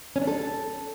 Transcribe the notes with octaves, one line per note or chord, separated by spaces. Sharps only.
C#4
D4
A4